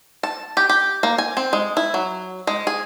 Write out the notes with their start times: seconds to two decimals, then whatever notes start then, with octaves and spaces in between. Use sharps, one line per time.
0.23 A5
0.57 G4
0.69 G4
1.03 A#3
1.18 G#5
1.37 C4
1.53 G#3
1.77 E4
1.94 F#3
2.47 G#3
2.67 G#4